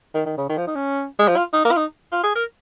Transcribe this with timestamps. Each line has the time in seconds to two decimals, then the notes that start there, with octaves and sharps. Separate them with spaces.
0.15 D#3
0.26 D#3
0.38 C#3
0.49 D#3
0.57 F3
0.67 D#4
0.75 C#4
1.19 G#3
1.28 F3
1.37 F4
1.53 D#4
1.65 A#3
1.71 F4
1.77 D#4
2.12 F4
2.24 G#4
2.35 A#4